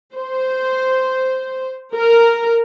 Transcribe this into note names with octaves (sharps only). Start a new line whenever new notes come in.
C5
A#4